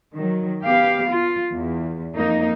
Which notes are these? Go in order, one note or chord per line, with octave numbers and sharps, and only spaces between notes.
D#3 F#3
B3 G4 F5
F4
E2
F2 A#3 D#4